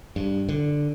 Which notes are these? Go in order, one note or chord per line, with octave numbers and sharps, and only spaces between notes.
G2
D3